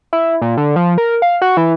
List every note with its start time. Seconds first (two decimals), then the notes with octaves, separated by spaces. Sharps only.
0.13 E4
0.42 A#2
0.57 D3
0.76 F3
0.98 A#4
1.22 F5
1.42 F#4
1.57 E3